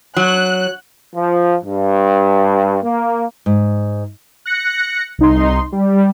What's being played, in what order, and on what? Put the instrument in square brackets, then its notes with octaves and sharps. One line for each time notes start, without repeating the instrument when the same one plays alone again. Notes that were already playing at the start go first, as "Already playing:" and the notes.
[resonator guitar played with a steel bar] F#3 [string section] F#6
[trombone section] F3
G2
A#3
[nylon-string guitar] G#2
[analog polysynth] F#6 A#6 C#7
C2 D#4 C6
G3